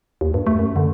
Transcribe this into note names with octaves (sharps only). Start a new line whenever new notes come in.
D#2
G2
A3
F#2
D3